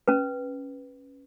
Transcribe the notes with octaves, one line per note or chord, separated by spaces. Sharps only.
C#4 B4